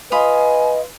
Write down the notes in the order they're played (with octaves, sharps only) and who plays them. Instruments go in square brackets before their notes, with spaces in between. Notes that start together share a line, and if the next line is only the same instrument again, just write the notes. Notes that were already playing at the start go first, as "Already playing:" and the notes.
[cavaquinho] F4 B5 D#6 [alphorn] B4 [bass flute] D#5 [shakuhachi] G#5